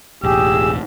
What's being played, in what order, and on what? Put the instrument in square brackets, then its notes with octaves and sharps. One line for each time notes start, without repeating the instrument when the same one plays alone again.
[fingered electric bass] E1 A1 [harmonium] G4 G#4 [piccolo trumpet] E6